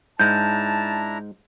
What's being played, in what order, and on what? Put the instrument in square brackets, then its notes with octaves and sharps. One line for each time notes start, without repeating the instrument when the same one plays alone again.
[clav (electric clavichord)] G#2 G#3 [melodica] D4 E4 A#5 [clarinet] A5 [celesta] G6